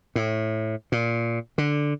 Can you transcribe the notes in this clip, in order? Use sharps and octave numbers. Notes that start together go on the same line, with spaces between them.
A2
A#2
D3